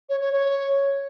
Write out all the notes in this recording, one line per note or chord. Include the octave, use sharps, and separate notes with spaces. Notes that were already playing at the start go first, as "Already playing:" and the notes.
C#5
C#5
C#5